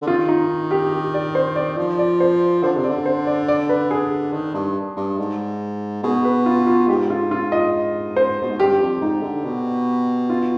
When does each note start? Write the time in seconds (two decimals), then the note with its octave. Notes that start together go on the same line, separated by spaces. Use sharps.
0.02 D3
0.07 D#3 F4
0.29 D#4
0.71 G4
0.93 G4
1.14 D5
1.35 C5
1.56 D5
1.77 F3
1.99 D5
2.20 C5
2.63 D3 C5
2.76 C3
2.84 D5
2.89 D3
3.06 C5
3.27 D5
3.48 D5
3.69 B4
3.91 G#4
4.33 D#3
4.54 G2
4.97 G2
5.18 G#2
6.03 B2 G#4
6.25 B4
6.46 F4
6.67 F4
6.88 G#2 G4
7.10 F4
7.31 F4
7.52 D#5
8.16 C5
8.42 B2
8.50 G#2
8.59 G2 G4
8.80 F2
9.01 G#2 D#4
9.22 D3
9.44 B2
10.30 F4